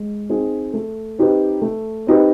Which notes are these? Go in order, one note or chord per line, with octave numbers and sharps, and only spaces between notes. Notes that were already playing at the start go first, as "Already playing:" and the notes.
Already playing: G#3
C4 D#4 G#4
A3
C4 D#4 G4 B4
A3
C4 D#4 G4 B4